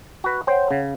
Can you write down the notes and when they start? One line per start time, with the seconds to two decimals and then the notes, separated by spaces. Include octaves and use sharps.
0.24 F#4 B4
0.47 C5 C#5 F#5 G5
0.71 C#3